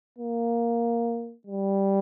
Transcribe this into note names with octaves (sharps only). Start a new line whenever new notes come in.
A#3
G3